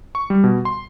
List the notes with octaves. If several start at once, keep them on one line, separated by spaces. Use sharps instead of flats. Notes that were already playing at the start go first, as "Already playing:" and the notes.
C#6
G3
B2
C6